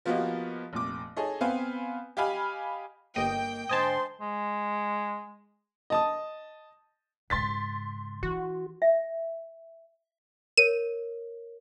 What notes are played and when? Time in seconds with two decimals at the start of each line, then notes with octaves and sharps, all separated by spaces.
0.06 F3 A#3 B3 F#4 G4 D#5
0.73 F1 A#2 D6
1.17 D#4 G#4 A4 C#5 D#5
1.41 B3 C4 B4 F5 G#5
2.17 G4 D#5 F5 G#5 B5 F6
3.16 G1 A#3 D#5 G5
3.69 G#2 D3 C5 D#5 G#5 A5 C6
4.21 G#3
5.90 D#5 A5 D#6
7.30 G#2 C#3 C6 A6 B6
8.23 E3 F#4
8.82 E5
10.57 A#4 C#5 D#7